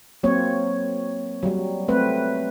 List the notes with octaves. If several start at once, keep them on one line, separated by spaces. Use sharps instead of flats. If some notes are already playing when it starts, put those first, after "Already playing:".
F#3 A#3 C4 C#5
F#3 G3
A3 C4 B4